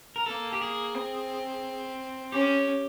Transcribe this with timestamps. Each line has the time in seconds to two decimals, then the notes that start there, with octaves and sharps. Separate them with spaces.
0.16 A#4
0.26 A#3 A4
0.52 G4
0.62 G#4
0.95 C4
2.32 C#4 G4